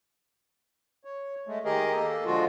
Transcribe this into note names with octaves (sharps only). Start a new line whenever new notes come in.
C#5
G#3 A3
D#3 G4 G#4 A#4 D#5
A#3 A4
D3 F3 G#3 F4 F#4